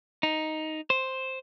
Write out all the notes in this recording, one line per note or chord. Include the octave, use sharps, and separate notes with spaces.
D#4
C5